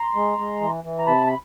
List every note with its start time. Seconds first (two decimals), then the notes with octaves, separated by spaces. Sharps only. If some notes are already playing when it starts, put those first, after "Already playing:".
Already playing: A#5 C6
0.15 G#3
0.38 G#3
0.61 E3
0.84 E3
0.99 A#5
1.07 C3 A5 B5
1.27 B5